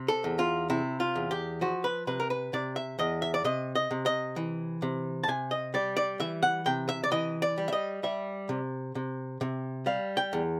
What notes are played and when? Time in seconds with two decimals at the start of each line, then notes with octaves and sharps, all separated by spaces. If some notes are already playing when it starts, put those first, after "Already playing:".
Already playing: C3
0.08 A4
0.24 E2
0.39 F4
0.70 C3 E4
1.00 F4
1.16 E2
1.31 G4
1.61 F3 F#4
1.84 B4
2.07 C3 B4
2.20 A#4
2.30 B4
2.53 C3 D5
2.76 E5
2.99 E2 D#5
3.22 E5
3.34 D5
3.44 C3 D#5
3.75 D#5
3.91 C3
4.06 D#5
4.36 E3
4.82 C3
5.24 A5
5.28 C3 G#5
5.51 D#5
5.74 G3 D5
5.97 D5
6.20 E3 E5
6.43 F#5
6.66 C3 G5
6.89 E5
7.04 D5
7.12 E3 D#5
7.42 D5
7.58 G3
7.68 E5
7.73 D#5
8.03 G3 E5
8.49 C3
8.95 C3
9.41 C3
9.86 G3 F5
10.17 G5
10.33 E2